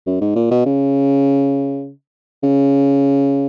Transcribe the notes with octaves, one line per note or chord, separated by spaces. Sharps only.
F#2
G#2
A#2
B2
C#3
C#3